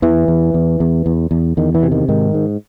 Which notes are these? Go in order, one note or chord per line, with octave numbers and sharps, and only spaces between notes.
E2 E3
E2
E2
E2
E2
E2
E2 D#3
E3
C3
D#3
G#2 D#3
G#2